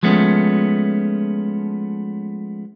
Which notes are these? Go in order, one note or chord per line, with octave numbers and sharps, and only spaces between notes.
F3 G#3 A3 B3 C#4